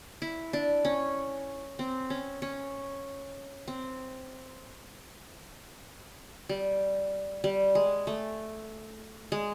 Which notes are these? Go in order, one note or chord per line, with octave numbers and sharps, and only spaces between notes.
E4
D4
C#4
C4
C#4
C#4
C4
G3
G3
G#3
A3
G#3